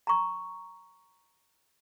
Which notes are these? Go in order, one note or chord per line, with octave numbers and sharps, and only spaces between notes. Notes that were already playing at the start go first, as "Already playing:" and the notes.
A#5 C#6